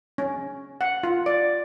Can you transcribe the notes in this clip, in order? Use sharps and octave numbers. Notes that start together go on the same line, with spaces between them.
C#4
F#5
F4
D5